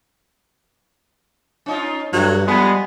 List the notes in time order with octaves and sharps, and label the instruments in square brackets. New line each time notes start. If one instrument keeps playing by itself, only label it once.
[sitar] C#4 D#4 F4
[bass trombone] G2 [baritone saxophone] F#3 [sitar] A3
[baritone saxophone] F3 [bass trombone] G3 [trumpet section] G#3 B3